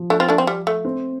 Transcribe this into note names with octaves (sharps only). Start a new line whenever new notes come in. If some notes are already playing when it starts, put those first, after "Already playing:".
Already playing: F3
A3 D4
C4 F4
A3 D4
C4
G3
A3
C4